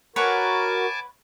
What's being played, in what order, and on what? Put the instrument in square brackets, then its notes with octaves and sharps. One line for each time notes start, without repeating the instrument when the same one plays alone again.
[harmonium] F#4 A#4 [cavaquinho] B4 C#5 F#5 [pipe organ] G#5 A5 D6